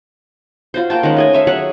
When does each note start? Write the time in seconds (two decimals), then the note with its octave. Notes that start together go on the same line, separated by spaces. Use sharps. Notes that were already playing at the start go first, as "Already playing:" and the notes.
0.74 F4 F#4 C5
0.90 A#3 F4 G5 A5
1.03 D#3 G#3 C#4 F#5
1.17 A3 D#5 G#5
1.33 C#5 E5 F5
1.47 F#3 G#4 C#5 F#5